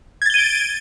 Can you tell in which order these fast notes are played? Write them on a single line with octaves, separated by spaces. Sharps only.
G#6 A6 G7 D#7 D7